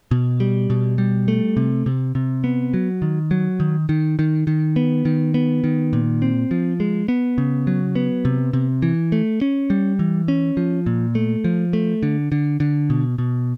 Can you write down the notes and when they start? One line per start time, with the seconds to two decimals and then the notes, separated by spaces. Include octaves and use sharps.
0.11 B2
0.40 G3
0.70 B2
0.98 G3
1.28 A3
1.57 C3
1.86 C3
2.15 C3
2.44 B3
2.74 F#3
3.02 D#3
3.31 F#3
3.60 D#3
3.89 D#3
4.19 D#3
4.47 D#3
4.76 B3
5.05 D#3
5.34 B3
5.64 D#3
5.93 A#2
6.22 C4
6.51 F3
6.80 G#3
7.08 B3
7.38 C#3
7.67 F#3
7.95 B3
8.25 C3
8.53 C3
8.82 E3
9.12 A3
9.41 C#4
9.70 G3
9.99 E3
10.28 C#4
10.57 F3
10.86 A#2
11.15 A3
11.44 F3
11.73 A3
12.03 D3
12.32 D3
12.60 D3
12.90 B2
13.18 B2